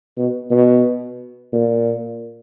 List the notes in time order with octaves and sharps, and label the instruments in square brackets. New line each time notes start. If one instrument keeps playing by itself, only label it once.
[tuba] B2
B2
A#2